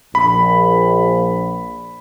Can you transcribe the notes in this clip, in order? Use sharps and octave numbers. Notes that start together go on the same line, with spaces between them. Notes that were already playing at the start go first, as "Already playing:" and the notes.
A#1 B5